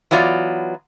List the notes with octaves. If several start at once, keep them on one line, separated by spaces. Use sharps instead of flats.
E3 F#3 B3 F4 D5